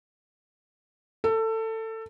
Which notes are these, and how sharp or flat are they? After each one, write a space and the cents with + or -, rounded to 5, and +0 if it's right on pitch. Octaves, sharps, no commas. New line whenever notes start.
A4 +20